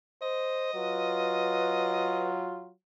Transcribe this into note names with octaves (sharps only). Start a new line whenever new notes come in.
C5 D#5
F#3 F4 B4